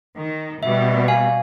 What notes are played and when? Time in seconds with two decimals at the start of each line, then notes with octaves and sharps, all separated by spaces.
0.16 D#3
0.63 B2 G3 E5
1.08 F5 G#5